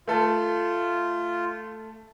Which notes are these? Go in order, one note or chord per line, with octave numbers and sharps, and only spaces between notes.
A3 F4 A4